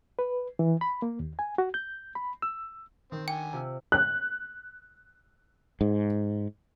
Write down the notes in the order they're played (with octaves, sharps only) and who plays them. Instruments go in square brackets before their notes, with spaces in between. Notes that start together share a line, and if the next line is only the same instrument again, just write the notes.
[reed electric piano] B4
E3
B5
A#3
D#2
G#5
F#4
G6
B5
E6
[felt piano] D#3 [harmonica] C4
[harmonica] D3 G#5 [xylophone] G5
[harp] C3 F4 E6
[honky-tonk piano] F#6
[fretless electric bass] G#2